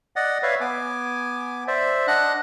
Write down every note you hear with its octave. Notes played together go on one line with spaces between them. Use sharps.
D5 D#5 F#5
B4 C#5 D5 E5 F5
B3 G#5 D6
C5 D5 E5
D4 D#5 F#5 F#6